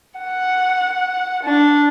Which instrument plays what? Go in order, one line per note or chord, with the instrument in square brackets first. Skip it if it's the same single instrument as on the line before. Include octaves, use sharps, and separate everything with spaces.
[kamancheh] F#5
D4